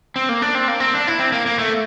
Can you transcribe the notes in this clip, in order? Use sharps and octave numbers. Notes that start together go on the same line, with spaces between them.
C4
A#3
D4
C4
A#3
C4
D4
E4
C4
A#3
A#3
A3